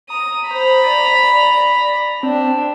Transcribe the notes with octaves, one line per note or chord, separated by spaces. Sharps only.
A#5 D#6
C5 A#5 B5
D5
D5
C4 D4